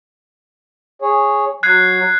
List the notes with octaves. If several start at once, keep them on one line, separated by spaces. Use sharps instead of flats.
G#4 C#5
F#3 F#6 G#6 C7